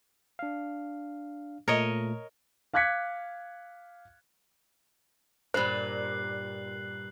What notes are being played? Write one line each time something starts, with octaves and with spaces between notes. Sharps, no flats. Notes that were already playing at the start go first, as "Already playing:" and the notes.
D4 F5
A#2 A3 A#4 C#5 D#5
F5 D6 F#6 G#6 B6 C#7
G2 A#2 C5 F#6 C7 F#7